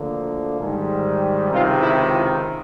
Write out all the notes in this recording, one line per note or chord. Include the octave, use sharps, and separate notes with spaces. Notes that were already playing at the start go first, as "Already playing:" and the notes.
Already playing: D2 D3 F3 A#3
G#2 D#3 G3
C#2 C3 D#3 F4
E4
F4